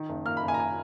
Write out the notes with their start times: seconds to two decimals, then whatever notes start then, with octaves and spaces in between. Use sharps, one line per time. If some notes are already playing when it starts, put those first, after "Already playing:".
Already playing: D#3
0.09 F#1
0.25 A#3 F6
0.37 B5
0.43 F#1
0.48 G#5
0.54 A#5
0.60 G#5